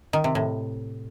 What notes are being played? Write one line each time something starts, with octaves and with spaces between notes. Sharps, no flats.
D#3
C3
A2